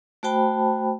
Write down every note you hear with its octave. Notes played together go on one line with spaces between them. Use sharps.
A3 F#4 C5 G5 A5 B5